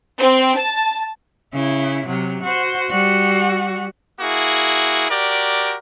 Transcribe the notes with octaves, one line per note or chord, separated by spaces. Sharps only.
C4
A5
C#3 E4
C3 F#3
F#4 C5
G3 F#4
A#3 E4 F#4 G#4
F#4 G4 A#4 D5